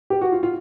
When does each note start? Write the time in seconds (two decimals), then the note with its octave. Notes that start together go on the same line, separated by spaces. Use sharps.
0.10 G4
0.21 F#4
0.32 F4
0.43 F4